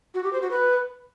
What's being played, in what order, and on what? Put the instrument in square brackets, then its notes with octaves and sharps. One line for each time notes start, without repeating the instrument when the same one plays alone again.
[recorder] F#4
G4
C5
F#4
B4